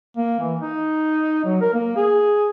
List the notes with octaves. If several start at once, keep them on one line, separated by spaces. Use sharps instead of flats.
A#3
E3
D#4
F#3
A#4
A#3
G#4